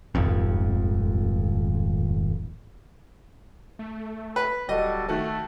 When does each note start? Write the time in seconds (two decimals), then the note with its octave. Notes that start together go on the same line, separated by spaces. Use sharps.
0.15 D#1 G#1 F2
3.79 A3
4.36 B4
4.69 D1 G3 F#4 A4 D#5
5.09 D#3 A3 F#4 A4